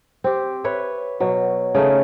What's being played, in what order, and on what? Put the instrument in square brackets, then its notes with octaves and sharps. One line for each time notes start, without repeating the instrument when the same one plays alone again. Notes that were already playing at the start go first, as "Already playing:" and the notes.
[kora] C4 G4
B4 C#5 E5
B2 F#3
C#3 A3 D#4